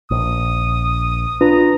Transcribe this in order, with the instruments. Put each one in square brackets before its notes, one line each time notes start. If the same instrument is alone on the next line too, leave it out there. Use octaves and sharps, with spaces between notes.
[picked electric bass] A#1 [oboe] D#6
[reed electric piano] D4 F4 B4 [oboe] A#5